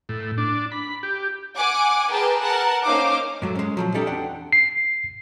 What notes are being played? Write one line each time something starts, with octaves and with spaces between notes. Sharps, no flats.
A2
D4
B5
G4
F#5 G#5 D6
G#4 A#4 B4 G5 A5
A#4 F#5 A5
A#3 C#4 D#4 C5 F5 D6
G#2 F#3 A3
G#3 C#4
A#2 F3 F#3
C#4 D#4 G4 A4 D5 E5
E2 C4 D4 F#5 G5
C7